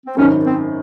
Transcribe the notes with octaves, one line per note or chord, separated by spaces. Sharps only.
C4
G#1 F#2 D#3 C#4
C4